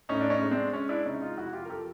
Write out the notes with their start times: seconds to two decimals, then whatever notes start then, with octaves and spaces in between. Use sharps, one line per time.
0.09 A2 C#4 D#4
0.21 D4
0.30 C#4 D#4
0.41 G#3
0.51 C4 D4
0.73 G#3 C#4
0.89 D4 E4
1.06 C3 C#4 D#4
1.22 D#4 F4
1.37 F2 E4 F#4
1.53 F4 G4
1.66 A#4
1.69 F3 G4 A4